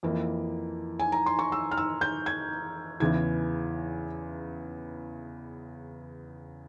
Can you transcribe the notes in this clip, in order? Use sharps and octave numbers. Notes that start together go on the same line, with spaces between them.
F2 E3 A#3
G#5
A#5
C6
C#6
E6
F6
E6
G6
G#6
E2 C#3 E3 G#6